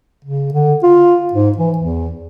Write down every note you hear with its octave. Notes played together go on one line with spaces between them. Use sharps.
C#3
D3
F4
G#2
E3
E2